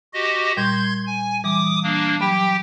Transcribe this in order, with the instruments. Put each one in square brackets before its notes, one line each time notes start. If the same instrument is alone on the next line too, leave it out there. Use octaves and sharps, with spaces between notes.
[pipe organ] F#4 G4 D#5
[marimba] A#2 G3 [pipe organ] C6 G6 G#6
[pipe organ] G#5
[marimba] E3 G3 [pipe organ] D6 D#6
[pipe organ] A#3 D4
[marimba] F#3 B5 [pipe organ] G4 G5